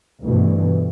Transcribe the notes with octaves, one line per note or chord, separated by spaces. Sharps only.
D2 G2 B2 E3